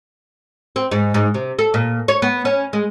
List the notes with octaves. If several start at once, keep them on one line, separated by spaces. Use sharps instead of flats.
C4
G#2
G#2
C3
A4
A#2
C#5
B3
C#4
G#3